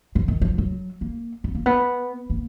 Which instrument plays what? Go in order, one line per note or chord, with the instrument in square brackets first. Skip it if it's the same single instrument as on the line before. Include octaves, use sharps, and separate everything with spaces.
[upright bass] F3
D#3
F3
F#3
A#3
B3
A#3
B3
A#3